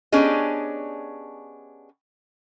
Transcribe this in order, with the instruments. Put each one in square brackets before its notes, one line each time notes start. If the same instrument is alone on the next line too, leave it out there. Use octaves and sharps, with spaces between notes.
[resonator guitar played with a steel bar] B3 C#4 D4 G4 G#4 D#5